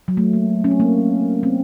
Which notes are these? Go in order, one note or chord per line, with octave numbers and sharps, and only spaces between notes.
F#3
A3
A#3
C#4
C4
A#3
C4